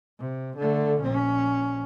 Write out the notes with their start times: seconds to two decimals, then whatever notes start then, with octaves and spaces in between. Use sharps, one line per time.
0.20 C3
0.57 D3 A3
1.02 A#1 C#4